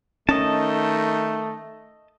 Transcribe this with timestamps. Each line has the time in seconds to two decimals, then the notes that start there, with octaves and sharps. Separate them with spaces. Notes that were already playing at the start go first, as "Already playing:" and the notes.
0.29 D#3 A3 C#4 D#5 A5